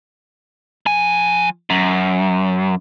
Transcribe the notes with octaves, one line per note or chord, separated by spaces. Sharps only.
F3 G#5
F#2